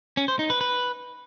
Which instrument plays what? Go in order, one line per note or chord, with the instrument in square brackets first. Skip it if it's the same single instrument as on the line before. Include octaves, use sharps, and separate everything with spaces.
[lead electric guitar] C#4
C5
D#4
B4
B4